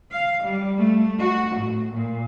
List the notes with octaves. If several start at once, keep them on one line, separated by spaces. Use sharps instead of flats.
F5
G3
A3
F#4
A2
A#2